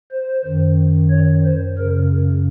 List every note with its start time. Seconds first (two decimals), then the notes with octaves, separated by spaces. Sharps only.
0.11 C5
0.44 F#2 D#3
1.10 C#5
1.45 C5
1.77 F#2 C#3 A#4